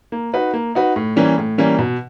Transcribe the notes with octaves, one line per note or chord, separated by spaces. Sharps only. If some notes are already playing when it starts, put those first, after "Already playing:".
A#3
D#4 F#4 B4
A#3
D#4 F#4 B4
A2
E3 G3 A#3 C#4
A2
E3 G3 A#3 C#4
B2